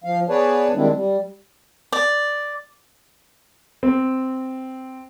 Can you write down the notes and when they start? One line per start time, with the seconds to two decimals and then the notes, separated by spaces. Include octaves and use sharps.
0.04 F3 F5
0.29 B3 G#4 B4 C#5 D5 A5
0.74 D#3 G3 G#3 C4 D4 E4
0.93 G3
1.92 D5
3.83 C4